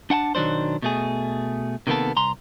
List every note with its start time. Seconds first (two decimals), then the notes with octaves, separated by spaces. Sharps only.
0.10 D4 F#5 G5 A5
0.35 B1 D#3 F#3 D4 C5
0.82 B2 A3 G#4
1.87 C3 D#3 A#3 B3 A4
2.16 C2 A#5 C6